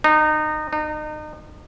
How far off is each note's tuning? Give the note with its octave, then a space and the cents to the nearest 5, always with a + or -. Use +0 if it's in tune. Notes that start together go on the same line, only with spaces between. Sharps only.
D#4 -25
D#4 -35